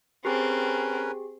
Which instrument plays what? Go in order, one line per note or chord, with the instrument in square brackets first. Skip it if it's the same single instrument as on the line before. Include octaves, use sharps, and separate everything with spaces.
[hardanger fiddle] C4 [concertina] C#4 A#4 B4 [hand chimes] G4 G#4